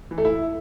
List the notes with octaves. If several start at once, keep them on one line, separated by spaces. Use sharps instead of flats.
E3
A3
E4